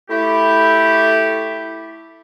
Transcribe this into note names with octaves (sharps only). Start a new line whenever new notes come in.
A3 E4 G4